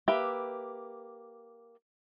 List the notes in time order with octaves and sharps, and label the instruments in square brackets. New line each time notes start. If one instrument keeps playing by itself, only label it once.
[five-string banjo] A#3 G4 B4 E5